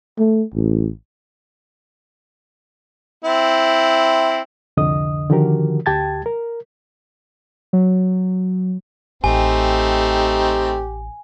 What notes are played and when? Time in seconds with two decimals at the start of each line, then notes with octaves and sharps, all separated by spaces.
0.19 A3
0.54 A1
3.24 C4 E4
4.77 C2 F2 D3 D#5 D#6
5.30 D3 D#3 F3 F#4 G4 A#4
5.86 D2 G4 G5 A5 G#6 A6
6.26 A#4
7.73 F#3
9.24 A1 A3 C4 D#4 G4 G#5